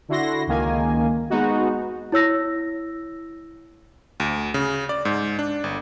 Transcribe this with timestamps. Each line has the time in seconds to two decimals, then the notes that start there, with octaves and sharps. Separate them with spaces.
0.08 D3 E4 F#4 C6 A#6
0.47 C#2 D#3 A#3 G#5
1.30 G#3 B3 D#4 F#4
2.12 E4 C#5 E6 A#6
4.20 D2
4.54 C#3
4.89 D5
5.05 G#2
5.39 D4
5.64 G1